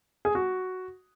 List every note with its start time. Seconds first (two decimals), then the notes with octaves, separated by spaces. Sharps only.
0.25 G#4
0.35 F#4